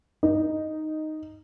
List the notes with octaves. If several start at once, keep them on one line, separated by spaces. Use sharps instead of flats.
D#4